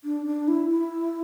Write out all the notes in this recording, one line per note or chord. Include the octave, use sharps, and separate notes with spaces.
D4
D4
E4
E4